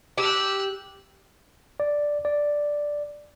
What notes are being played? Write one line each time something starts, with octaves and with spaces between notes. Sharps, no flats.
G4 E6 F#6
D5
D5